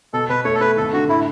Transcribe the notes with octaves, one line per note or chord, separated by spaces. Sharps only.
B2 A4
B2 B4
A3 C#5
A4
A3 B4
G#1 A4
D3 F#4
A2 E4